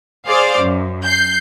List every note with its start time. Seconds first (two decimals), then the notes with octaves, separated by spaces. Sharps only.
0.28 G#4 C5 D5 F5
0.60 F#2
1.05 G6 C7